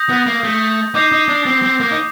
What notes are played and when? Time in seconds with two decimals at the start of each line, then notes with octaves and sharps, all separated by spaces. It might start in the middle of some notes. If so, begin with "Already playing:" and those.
Already playing: D#6 G6 A#6
0.10 B3
0.26 A#3
0.44 A3
0.95 D#4 D6 G6 C7 F7
1.12 D#4
1.28 D4
1.46 C4
1.63 C4
1.80 A#3
1.91 D#4